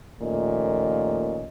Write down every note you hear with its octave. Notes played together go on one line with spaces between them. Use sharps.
D#2 A#2 F3 A3 C#4 D#5